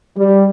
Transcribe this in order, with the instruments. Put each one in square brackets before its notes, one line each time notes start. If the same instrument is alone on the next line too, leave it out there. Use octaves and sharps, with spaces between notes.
[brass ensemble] G3